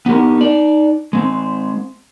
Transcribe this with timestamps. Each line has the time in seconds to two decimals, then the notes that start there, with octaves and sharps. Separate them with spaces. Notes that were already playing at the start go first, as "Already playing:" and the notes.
0.06 B3 D#4 G4 A#4
0.38 D#4 D5
1.13 G#3 C4